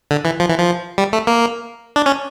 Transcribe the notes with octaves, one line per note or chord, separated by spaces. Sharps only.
D3
E3
F3
E3
F3
G3
A3
A#3
D4
C#4